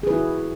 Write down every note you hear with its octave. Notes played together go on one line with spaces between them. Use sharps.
E4 F#4 G#4 B4